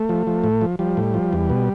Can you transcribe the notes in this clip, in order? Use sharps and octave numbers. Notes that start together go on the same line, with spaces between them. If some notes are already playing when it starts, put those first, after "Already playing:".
Already playing: A3
F3
F3
A2
F3
F3 G3
A2
F3
E2
B2